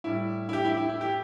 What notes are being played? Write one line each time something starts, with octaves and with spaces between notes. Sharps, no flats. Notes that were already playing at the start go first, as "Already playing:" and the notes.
A2 G3 E4
E4
G4
E4
E4
E4
G4